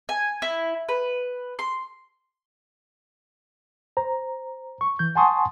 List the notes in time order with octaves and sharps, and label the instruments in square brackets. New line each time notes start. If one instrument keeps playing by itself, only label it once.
[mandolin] G#5
E4
B4
C6
[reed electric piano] C5 A#5
C#6
E3 G6
F#5 G#5 A5 C6 C#6 D#6